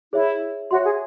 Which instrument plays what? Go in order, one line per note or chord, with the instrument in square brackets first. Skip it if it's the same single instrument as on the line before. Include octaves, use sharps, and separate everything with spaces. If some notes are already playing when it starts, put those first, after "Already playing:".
[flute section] E4 [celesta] G#4 C#5 E5
[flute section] F#4 [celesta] C#5 E5 C6
[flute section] G#4